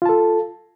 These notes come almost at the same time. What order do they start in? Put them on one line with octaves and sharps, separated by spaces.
F4 A5 A4